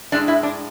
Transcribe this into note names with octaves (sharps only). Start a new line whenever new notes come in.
A2 G#3 D4
E4
D4